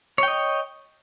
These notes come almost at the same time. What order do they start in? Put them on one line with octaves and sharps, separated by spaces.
C#5 G5 D#5